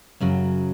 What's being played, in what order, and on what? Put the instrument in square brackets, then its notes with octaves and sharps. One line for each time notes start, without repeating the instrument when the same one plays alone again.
[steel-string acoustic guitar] F#2 C#3 F#3